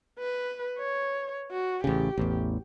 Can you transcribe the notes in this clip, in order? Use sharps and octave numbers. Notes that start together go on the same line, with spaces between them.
B4
C#5
F#4
A1 C#3 G4
A1 E2